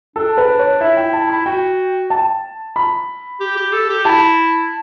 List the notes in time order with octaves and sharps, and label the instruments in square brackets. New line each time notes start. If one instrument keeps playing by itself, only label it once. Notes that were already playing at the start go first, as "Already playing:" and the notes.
[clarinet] D4 [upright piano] A4
[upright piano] B4
C#5
[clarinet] E4 [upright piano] E5
[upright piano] G5
A5
B5
[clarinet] F#4 [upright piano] G5
[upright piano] A5
B5
[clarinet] G4
G4
A4
G4
[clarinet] E4 [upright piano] A5